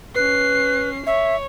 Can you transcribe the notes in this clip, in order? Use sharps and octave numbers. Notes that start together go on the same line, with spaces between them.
C#4 B4 C7
C#5 E5